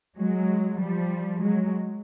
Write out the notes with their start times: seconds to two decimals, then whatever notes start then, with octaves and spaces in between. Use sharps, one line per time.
0.18 F#3 G#3
0.80 F3 G3
1.42 F#3 G#3